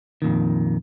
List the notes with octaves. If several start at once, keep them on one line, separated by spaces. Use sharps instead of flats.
F2 A#2 D#3